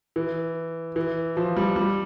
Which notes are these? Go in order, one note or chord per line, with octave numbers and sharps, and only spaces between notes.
E3
E3
F3
G3
G3